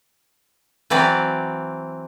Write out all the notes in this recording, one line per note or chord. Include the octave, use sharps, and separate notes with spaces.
E3 F#3 C4 D5